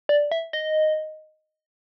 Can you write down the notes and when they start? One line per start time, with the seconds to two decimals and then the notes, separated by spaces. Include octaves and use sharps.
0.09 D5
0.32 E5
0.53 D#5